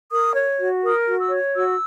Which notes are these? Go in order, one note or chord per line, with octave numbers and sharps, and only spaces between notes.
A#4 D#6
C#5
F#4
A#4 D#6
F#4
E6
C#5
F#4 E6